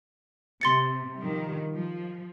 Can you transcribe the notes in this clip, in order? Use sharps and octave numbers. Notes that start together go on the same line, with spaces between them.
C3 C6 A6 C#7
D#3 F3 G3
F3